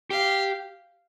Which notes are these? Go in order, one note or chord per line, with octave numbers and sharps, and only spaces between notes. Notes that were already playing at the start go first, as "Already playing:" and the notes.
G4 F5